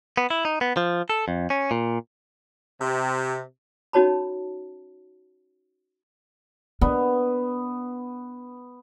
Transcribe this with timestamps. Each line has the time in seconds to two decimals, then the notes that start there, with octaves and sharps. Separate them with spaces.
0.17 B3
0.30 E4
0.45 D#4
0.61 B3
0.77 F3
1.10 A4
1.28 F2
1.50 C#4
1.71 A#2
2.81 C3
3.93 C#4 D#4 F#4 C#5 A5 B5
6.82 B3 D4